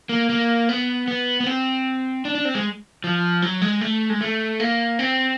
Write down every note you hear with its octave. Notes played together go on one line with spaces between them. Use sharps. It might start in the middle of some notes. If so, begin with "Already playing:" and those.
A#3
A#3
B3
B3
B3
C4
D4
D4
C4
G#3
F3
F#3
G#3
A3
G#3
A3
A#3
C4